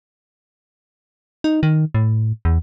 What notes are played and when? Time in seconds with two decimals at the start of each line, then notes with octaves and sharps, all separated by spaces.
1.44 D#4
1.63 D#3
1.94 A2
2.45 E2